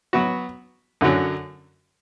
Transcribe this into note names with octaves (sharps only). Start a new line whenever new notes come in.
F#3 B3 F#4
F#2 D3 F#3 C#4